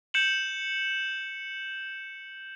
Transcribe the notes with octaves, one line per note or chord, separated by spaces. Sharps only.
G6 C#7 E7 F#7